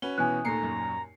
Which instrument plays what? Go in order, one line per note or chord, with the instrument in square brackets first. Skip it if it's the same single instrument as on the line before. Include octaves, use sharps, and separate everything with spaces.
[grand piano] C#4 F#4 B4 [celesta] G7
[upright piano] B2 E3 [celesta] G#5 F#6
[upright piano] D#2 A#2 [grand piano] A3 C7 C#7 [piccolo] A#5
[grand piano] F#2